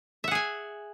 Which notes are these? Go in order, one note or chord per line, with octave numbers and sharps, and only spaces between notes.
G#4 E5 F#5 G#5